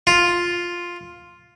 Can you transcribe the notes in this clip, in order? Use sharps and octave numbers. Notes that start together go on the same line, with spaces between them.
F4